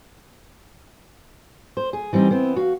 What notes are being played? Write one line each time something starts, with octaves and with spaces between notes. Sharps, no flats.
C5
G#4
E3 G3 C4 D#4
B3 C4 E4
F#4 F5